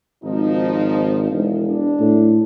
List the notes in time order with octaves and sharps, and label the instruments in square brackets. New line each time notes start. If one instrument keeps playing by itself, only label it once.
[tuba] G#1 [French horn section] F3 D#4
[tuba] E1
[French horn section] D4
[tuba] A2